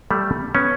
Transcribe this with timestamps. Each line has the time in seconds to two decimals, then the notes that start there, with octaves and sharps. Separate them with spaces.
0.11 G3 A3
0.55 B3 C#4